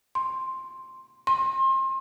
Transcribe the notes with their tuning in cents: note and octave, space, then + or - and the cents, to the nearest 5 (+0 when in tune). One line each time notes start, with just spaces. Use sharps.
C6 +5
C6 +30